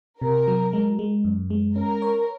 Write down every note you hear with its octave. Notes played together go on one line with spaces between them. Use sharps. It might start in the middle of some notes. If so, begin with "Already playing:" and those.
C3 A#4
F#3
G#3
G#3
F#2
G#3
C#4 A#4
C#5